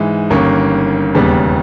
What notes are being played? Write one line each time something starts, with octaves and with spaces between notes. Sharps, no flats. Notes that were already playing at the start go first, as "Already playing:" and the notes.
Already playing: G#2 E3 G#3
G1 G2 D#3 A#3 C#4
E1 D#2 C#3 G3 B3